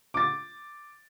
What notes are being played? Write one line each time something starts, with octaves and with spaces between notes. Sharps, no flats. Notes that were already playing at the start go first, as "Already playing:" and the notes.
D6 A6